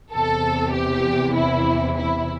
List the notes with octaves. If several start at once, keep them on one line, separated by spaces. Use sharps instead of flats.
E2 C3 E3 A4
G4
E4
E4